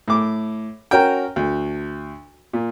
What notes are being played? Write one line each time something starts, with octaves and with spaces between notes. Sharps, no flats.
A2 D6
C#4 F#4 A#4 G5
D2
A#2